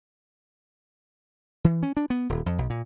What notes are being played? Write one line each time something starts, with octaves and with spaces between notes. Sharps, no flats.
E3
C#4
D4
B3
D#1
F2
B1
A#2